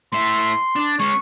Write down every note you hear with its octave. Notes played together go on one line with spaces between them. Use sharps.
A2 E5 C6
D4
G#3 C#4 C#6